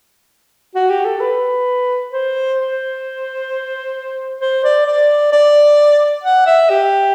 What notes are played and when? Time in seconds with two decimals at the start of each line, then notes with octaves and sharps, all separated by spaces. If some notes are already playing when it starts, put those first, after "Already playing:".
0.75 F#4
0.90 G4
1.05 A4
1.20 B4
2.12 C5
2.58 C5
4.41 C5
4.64 D5
4.86 D5
5.32 D5
6.24 F#5
6.46 E5
6.70 G4